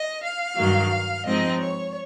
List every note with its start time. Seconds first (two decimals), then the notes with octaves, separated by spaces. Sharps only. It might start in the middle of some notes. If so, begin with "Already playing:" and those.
Already playing: D#5
0.23 F5
0.57 G2 D#3 F#3
1.25 G#2 F3 G#3 C4 D#4 D#5
1.60 C#5